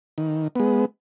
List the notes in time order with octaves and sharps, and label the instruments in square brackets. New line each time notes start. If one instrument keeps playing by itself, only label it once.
[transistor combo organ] D#3
G#3 B3